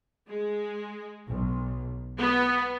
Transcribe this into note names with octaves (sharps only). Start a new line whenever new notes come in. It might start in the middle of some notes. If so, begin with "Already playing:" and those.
G#3
B1
B3